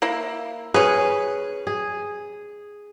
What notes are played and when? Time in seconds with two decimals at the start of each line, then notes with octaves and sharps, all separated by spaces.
0.02 A#3 E4
0.74 C#4 G#4 B4
1.67 G#4